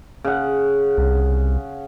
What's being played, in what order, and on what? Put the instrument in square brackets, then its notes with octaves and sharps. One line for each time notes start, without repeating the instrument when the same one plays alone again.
[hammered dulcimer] C#3 F#5
[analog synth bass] C2